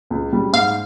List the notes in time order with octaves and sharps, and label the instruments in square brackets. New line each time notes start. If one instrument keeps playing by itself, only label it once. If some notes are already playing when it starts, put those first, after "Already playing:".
[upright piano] C#2
C#3 G3
[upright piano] G#2 [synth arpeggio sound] F5